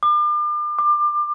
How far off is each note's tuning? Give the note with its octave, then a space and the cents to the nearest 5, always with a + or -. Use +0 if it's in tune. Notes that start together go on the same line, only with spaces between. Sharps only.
D6 +35
D6 +25